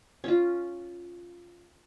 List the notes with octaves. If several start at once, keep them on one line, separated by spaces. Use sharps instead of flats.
C#4 F4